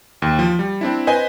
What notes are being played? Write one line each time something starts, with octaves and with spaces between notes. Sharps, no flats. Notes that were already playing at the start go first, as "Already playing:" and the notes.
D#2
F3
G3
C4 D4 E4
B4 C5 D#5 G#5